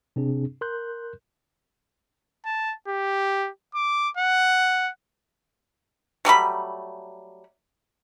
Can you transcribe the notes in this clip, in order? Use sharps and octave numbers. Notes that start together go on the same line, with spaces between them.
C3 C4 D4 G#4
A#4 C6 F#6 G6
A5
G4
D6
F#5
F#3 G3 A3 B5